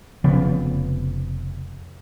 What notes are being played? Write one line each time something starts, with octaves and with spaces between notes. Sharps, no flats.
F1 C#3 F3 B3